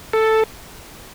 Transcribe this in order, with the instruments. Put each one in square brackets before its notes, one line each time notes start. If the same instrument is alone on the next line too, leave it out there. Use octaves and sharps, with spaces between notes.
[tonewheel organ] A4